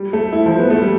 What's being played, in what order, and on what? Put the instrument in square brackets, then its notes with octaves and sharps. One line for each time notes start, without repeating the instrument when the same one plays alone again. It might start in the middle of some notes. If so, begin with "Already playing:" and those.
Already playing: [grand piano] G3
A3
E4
F3
B3
A3
G3